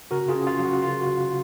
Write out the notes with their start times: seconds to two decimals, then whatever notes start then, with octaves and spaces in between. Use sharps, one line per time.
0.11 C#3 F#4 A#4
0.28 F4 G#4
0.35 C#4
0.47 F4
0.59 F#3
0.65 F#4
0.82 C#3 F4
1.00 F#4
1.07 C#3